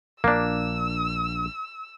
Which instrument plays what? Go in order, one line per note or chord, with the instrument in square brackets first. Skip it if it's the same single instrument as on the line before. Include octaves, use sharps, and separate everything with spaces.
[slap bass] A#1 [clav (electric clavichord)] A#3 D4 [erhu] E6